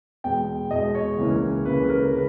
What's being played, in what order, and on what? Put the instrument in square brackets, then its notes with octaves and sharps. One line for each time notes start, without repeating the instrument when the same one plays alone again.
[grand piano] E2 B2 G#3 G5
E2 B2 G#3 D#5
C#5
C#2 C#3 E3 A#3 C#4
C#2 C#3 E3 A#3 C#4 B4
B4
A#4
C#3 G#3 B4